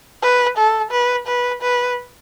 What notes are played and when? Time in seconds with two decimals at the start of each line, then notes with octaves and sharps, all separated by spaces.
0.22 B4
0.57 A4
0.91 B4
1.27 B4
1.62 B4